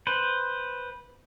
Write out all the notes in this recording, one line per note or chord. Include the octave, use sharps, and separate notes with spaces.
B4 C5